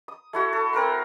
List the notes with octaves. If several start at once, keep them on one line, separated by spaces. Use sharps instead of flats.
D#6
A3 E4 F#4
A4
C4 A#4 F#5 C6